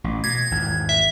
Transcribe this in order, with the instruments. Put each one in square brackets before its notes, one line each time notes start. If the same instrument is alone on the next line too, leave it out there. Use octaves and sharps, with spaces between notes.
[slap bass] A1
[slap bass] B2 [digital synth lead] G#6
[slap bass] G#1 E2
[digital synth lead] E5